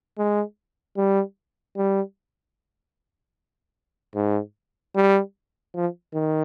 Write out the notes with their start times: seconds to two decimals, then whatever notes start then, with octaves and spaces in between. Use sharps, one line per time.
0.18 G#3
0.97 G3
1.77 G3
4.15 G#2
4.96 G3
5.75 F3
6.14 D#3